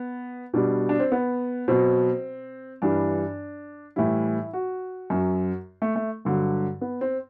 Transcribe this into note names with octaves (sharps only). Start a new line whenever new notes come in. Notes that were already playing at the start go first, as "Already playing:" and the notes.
Already playing: B3
B2 G3 D4
D4
C4
B3
B2 F#3 C4
G2 E3 G3 D4
A2 E3 G3 E4
F#4
F#2 F#3
A3
A3
G2 D3 F#3
B3
C4